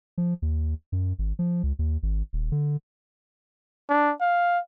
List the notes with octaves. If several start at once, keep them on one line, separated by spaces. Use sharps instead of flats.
F3
D#2
F#2
G#1
F3
C#2
D#2
G#1
D#1
D3
D4
F5